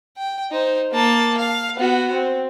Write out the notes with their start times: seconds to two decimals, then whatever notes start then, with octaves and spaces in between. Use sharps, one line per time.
0.18 G5
0.51 D#4 C5
0.92 A#3 A5
1.38 F5
1.77 B3 F#4
2.12 C4